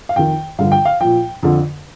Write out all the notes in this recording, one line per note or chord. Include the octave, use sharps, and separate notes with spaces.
F5
F2 D#3 G5
G2 D3 F3 F5
G5
F5
A#2 F3 G5
F2 D3 F3